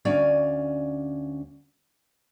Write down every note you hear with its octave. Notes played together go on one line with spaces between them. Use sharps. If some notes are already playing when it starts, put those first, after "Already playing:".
D2 C#4 D5 F5 G#5